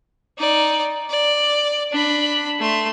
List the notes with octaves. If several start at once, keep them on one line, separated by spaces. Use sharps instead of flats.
D#4 D5
D5
D4 B5
A3 C6